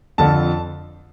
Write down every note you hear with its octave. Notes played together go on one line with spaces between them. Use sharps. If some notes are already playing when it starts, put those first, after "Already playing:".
F2 D3 F3 A5